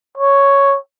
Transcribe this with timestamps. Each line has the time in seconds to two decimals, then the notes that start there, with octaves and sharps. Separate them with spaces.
0.18 C#5